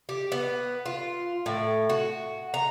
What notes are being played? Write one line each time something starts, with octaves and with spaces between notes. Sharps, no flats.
G4
B3
F4
A2
F#4
A#5